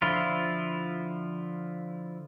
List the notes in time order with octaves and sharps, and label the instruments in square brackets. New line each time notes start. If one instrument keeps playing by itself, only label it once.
[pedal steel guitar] D3 F3 E4 F4